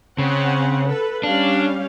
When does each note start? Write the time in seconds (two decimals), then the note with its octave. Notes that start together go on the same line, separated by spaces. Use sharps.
0.18 C#3 C4 C#5 F#5
0.87 A4 B4
1.24 G3 C#4 D4 F5